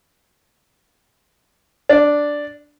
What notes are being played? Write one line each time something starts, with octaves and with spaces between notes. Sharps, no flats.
D4